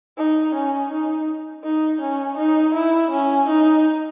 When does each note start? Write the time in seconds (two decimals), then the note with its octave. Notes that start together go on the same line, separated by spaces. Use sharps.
0.17 D#4
0.54 C#4
0.91 D#4
1.64 D#4
2.01 C#4
2.37 D#4
2.74 E4
3.11 C#4
3.48 D#4